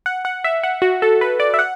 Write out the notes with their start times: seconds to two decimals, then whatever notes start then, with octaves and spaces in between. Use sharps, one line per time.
0.06 F#5
0.25 F#5
0.44 E5
0.63 F#5
0.82 F#4
1.02 A4
1.21 B4
1.40 D5
1.54 E5
1.59 F#5